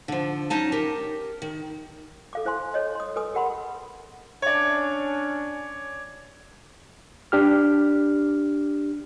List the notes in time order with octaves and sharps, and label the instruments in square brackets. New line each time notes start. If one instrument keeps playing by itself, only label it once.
[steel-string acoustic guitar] D3 F3
F#3 C#4 D#4 A5
G4 A#4
D#3
[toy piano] A4 F5 D6
E4 C5 G#5 C6
A4 C#5 D#5
C6 D#6
A4 B4 G#5 D#6
G#4 A#4 F#5 B5 C6
[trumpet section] C#4 D4 [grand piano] C#5 D5
[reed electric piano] D4 G4 F6